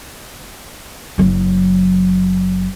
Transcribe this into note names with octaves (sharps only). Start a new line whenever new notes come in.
F#1 F#3